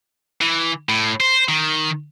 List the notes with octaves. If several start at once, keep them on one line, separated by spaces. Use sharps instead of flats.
E3
A2
C5
D#3